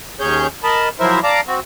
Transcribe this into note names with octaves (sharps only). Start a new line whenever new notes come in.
D#2 C#4 G#4 C#5 G6
A#4 D#5 A5 B5
F3 F#3 E4 A#4 C5 E5
D5 F5 A5 A#5 D6
C4 F#4